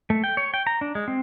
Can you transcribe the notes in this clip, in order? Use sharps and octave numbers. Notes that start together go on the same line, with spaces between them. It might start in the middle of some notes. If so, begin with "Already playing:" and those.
A3
G5
C#5
G5
A#5
D4
G#3
C4